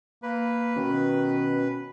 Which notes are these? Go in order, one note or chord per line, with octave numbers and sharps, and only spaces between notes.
A#3 B4
B2 D#3 C#4